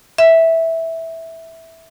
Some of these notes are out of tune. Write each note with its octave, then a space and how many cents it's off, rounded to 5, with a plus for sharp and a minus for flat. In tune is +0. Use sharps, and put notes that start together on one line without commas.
E5 -10